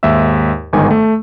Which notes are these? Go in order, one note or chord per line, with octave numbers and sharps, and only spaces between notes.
D#2 G#2 E5 E6
G1 G#2 D#3 G#5
A3